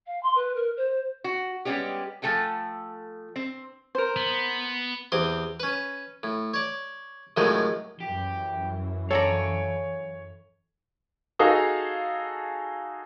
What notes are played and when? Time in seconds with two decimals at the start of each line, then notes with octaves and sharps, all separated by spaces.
0.06 F5
0.22 C6
0.35 B4
0.55 A#4
0.77 C5
1.24 F#4
1.65 G3 G#3 B3 C#4 G4
2.22 F3 A3 A4 G5 G#5
3.36 C4
3.95 A#4 C5
4.16 B3
5.12 E2 C4 G4 C5 D#6
5.60 C#4 B4
6.23 A2
6.54 C#5 D5
7.37 F#2 A2 C3 D#3 F3 G#3
8.00 F#2 E3 G4
9.11 A4 C#5 D5 F5 G#5 A#5
11.39 D#4 F#4 G#4 A4 F5